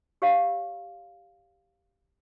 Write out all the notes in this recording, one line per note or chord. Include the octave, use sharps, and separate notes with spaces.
G4 C#5 F5